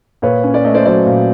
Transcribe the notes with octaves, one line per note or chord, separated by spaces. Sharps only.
A#2 B4 C#5
C#4
D5
A3 D#5
C5 D5
F#3 C5 D5
A#2